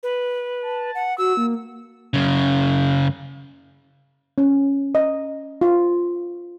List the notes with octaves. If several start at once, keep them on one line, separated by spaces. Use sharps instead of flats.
B4
A5
F#5
F#4 E6
A#3
F#2 C#3
C#4
D#5
F4